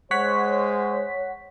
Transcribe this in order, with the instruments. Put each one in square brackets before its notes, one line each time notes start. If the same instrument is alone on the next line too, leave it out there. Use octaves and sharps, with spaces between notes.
[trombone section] G#3 C5 [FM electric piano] C#5 F#5 B6